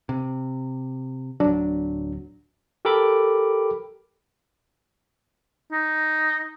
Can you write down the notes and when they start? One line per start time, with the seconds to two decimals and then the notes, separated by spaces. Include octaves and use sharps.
0.09 C3
1.40 D1 F#3 D4
2.85 G4 A4 A#4 G5 B5 D6
5.72 D#4